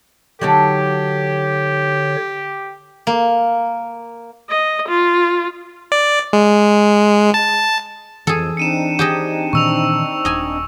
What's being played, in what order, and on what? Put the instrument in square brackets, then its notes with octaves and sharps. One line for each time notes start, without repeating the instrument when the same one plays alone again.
[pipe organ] D3 C#5 [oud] F#3 D#4 A4 [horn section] G4
[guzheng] A#3
[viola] D#5
F4
[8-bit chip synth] D5
G#3
A5
[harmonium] F2 [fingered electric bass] E3 [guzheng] G#4 A4
[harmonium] C4 D4 D#4 [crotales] C#7 D#7 E7
[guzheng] G4 G#4 D#5
[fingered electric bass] A#2 D#3 E3 [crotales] C#6 E6 F7
[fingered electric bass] D#1 [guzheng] D#5 G#5